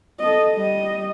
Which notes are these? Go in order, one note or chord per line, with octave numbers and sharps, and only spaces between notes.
A4 D#5
G3 D#5